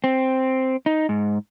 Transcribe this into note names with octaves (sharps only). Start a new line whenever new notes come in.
C4
D#4
G#2